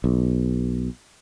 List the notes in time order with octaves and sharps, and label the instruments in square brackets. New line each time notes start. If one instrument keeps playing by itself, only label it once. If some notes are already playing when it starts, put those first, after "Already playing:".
[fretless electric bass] B1